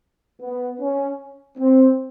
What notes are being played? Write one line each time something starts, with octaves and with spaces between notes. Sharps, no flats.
B3
C#4
C4